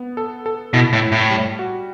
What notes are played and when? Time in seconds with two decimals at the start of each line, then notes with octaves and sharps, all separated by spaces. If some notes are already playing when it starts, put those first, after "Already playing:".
Already playing: B3
0.17 A4
0.46 A4
0.74 B2 E4
0.93 A2
1.02 E4
1.12 A2
1.31 G3
1.59 F#4